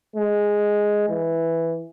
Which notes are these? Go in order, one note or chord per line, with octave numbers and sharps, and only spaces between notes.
G#3
E3